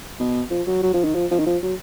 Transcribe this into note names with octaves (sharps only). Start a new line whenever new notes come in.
B2
F3
F#3
F#3
F3
D#3
F3
F3
D#3
F3
F#3